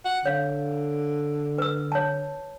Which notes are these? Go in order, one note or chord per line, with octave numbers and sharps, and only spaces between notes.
F#5
D3 C#5 F5
B4 E6
C#5 A5